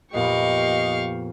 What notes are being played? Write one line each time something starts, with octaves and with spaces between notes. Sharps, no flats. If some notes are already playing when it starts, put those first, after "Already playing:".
F2 A#2 B3 G4 D#5 F5 C#6